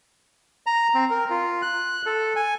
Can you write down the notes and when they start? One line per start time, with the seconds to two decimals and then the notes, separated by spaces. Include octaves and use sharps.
0.66 A#5
0.95 C4
1.10 A#4
1.30 F4
1.62 F#6
2.06 A4
2.36 G#5